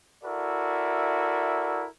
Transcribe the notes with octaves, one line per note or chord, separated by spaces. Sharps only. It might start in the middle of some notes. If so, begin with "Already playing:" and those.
E4 F#4 A4 A#4 D5 E5